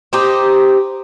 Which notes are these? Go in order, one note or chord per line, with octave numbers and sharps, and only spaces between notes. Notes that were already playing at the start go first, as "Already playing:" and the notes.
C4 D#4 G4